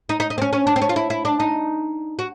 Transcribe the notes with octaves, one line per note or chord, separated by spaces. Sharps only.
D#4
D#4
D#4
C4
C#4
C#4
D4
C4
C#4
F4
E4
E4
D4
D#4
F#4